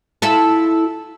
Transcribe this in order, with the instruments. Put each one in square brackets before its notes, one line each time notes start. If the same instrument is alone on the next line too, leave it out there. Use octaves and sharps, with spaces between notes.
[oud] E4 F4 A4